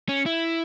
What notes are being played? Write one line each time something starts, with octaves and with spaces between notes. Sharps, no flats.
C#4
E4